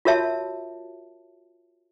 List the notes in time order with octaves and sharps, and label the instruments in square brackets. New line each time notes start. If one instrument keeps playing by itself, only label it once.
[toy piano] F4 F#4 A#4 C#5 E5 A5